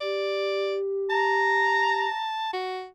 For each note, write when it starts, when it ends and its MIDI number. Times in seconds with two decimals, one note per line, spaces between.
0.01 2.06 67
0.01 0.76 74
1.10 2.50 81
1.10 2.29 82
2.53 2.86 66